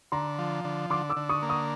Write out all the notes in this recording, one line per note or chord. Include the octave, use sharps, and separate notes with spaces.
D3 A#5 C6
F3
D3
D3 C6 D6
D6 E6
D3
C#6 D#6
A#3
C#6 D#6